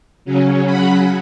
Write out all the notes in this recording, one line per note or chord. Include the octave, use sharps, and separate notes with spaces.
C#3 F#3 C#4
F#5 B5